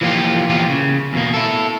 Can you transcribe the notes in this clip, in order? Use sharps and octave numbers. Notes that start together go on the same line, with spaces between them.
E3 F3 A#3 D4 F4 G4
E2 A#2 E3 F3 F4 G4
C#3
E2 B2 A#3
E4 A4